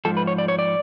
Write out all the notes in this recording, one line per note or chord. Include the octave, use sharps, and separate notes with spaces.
G#2 F3 A4
B4
C#5
D5
C#5
D5